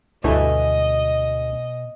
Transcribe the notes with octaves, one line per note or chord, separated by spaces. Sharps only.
D2 G2 B2 E3 A3 D#5 G#5